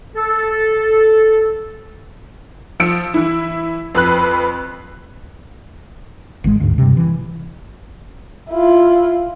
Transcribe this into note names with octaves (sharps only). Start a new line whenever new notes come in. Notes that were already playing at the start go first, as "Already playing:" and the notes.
A4
F3 E6 C#7 D7
E3 E4
F2 B4 F#6
G#1 C3 G#3
D2 G#2
G2 C3
E3
E4 F4